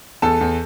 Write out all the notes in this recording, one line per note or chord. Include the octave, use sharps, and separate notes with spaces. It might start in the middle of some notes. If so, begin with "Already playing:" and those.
E2 A4 A5
E2